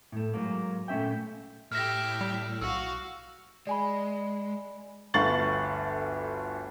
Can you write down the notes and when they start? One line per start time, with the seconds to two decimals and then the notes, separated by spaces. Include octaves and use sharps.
0.12 A2 A3
0.34 G#2 F#3 A#3
0.88 A#2 A3 C#4 E5 G5
1.72 A2 G4 E5 F6 A#6
2.21 G3
2.61 B1 F#4 F5 E6
3.67 G#3 D5 G#5 B5
5.14 G1 D2 F5 C#6 A6 F#7